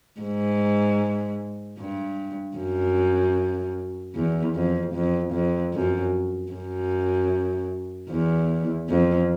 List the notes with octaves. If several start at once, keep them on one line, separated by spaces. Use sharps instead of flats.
G#2
G2
F#2
E2
F2
F2
F2
F#2
F#2
E2
F2